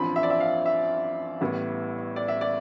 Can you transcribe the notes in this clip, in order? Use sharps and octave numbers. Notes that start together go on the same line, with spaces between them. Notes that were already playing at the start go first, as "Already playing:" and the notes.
Already playing: A1 G2 F3 C4 B5
E5
D5
E5
F5
E5
A1 A2 G3 B3
D5
E5
D5